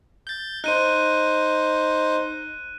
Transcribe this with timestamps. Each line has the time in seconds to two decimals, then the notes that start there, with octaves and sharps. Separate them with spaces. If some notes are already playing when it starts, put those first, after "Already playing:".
0.27 G6 A6
0.64 D#4 C5 F#6 D#7